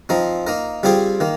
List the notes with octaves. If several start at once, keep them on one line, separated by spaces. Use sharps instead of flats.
F3 C4 D#4 A#4
A#3 D#4 A#4
G3 C4 F4 G#4 C5
D#3 A#3